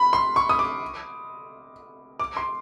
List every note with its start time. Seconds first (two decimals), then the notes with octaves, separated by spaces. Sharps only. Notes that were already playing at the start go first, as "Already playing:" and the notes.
Already playing: B5
0.13 C6
0.36 C#6
0.49 D#6
0.59 D6
2.20 D6
2.37 C6